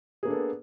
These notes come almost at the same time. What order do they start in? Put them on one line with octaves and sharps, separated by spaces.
G#4 A#3 D4 A4 B3